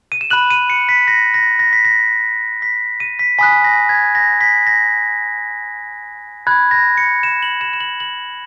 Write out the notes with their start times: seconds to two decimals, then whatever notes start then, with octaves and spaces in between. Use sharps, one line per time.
0.12 D#7
0.21 E7
0.30 B5 F#6 F#7
0.50 D#7
0.70 C#7
0.89 B6
1.08 A#6
1.34 A#6
1.59 A#6
1.73 B6
1.85 A#6
2.62 B6
3.00 D#7
3.19 B6
3.38 G#5 B5 D#6 F#6 B6
3.64 A#6
3.89 G#6
4.15 A#6
4.41 B6
4.67 A#6
6.47 B5 F#6 G#6
6.71 A#6
6.97 C#7
7.23 E7
7.43 F#7
7.61 E7
7.73 E7
7.80 F#7
8.00 F#7